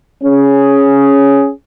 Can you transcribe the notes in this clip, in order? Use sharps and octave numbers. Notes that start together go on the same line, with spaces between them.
C#4 G#4